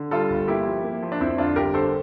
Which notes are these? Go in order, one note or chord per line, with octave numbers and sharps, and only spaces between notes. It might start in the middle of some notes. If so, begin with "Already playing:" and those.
Already playing: D3
G3 F4 A4
G1
A#3 E4 G4
F3
A#3
F3
D4
F2 C4 E4
D3 D4 F4
G1 G4 A#4
D3 A4 C5